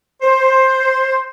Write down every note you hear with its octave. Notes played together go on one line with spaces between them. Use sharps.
C5